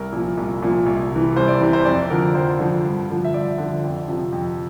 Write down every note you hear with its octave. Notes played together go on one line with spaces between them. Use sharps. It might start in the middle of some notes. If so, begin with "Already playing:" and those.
Already playing: C2 A#4
A#2 F3
C2
A#2 F3
C2
C3 E3
C2 C5
D5
C3 E3
C5
F2 D5
D3 F3 A#4
F2 C5
D3 F3
G2
D3 F3
E5
G2 D5
D3 F3
F2
C3 F3
F2